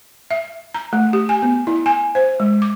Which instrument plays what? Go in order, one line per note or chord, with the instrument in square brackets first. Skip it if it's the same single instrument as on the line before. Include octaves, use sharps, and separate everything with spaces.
[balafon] E5
A#5
A3
G4
G#5
B3
E4
G#5
C5
G#3
D6